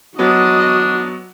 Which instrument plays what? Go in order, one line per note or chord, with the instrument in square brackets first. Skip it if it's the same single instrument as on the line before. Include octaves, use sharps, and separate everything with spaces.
[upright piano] F#3 B3 [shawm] D4 [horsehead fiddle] F#4 [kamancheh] D#5